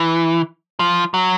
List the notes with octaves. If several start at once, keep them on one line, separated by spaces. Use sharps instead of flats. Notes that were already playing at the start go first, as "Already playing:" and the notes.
Already playing: E3
F3
F#3